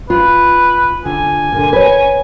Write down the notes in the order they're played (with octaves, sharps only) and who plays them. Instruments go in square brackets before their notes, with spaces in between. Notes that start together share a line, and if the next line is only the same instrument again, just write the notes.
[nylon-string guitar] F4 [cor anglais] B4
[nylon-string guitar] D3 F4 [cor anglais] G#5
[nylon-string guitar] A#2 D3
B4 C#5